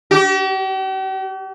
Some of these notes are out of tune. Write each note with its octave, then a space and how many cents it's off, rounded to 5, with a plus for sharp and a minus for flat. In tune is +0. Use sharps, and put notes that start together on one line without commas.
G4 -45